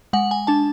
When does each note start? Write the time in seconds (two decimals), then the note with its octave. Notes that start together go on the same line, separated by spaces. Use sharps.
0.13 G#3 F#5
0.31 G#5
0.47 D4 A5